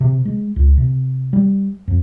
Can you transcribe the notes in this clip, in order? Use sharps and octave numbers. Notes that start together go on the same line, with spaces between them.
C3
G#3
C#2
C3
G3
F2